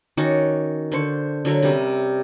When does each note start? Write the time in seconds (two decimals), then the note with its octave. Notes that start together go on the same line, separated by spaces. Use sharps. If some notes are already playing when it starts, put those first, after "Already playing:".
0.17 D#3 C#4 F#4 D6
0.92 D3 C5 C#6
1.45 D3 F#3 A#4 E5
1.62 C3 G3 C#4